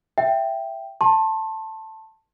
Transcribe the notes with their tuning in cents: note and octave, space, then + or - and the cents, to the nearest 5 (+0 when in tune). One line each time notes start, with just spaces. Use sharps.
E5 +10 G5 +0
A5 +5 C6 +40